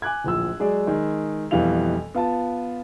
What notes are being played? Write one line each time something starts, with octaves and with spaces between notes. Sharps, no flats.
G#5 D6 F#6 G#6
D1 A#1 F3 E6
F#3 G#3 G#4 D5
D#3 G#3 G#4
F2 B2 E3 G3 F5 F7
B3 F4 A5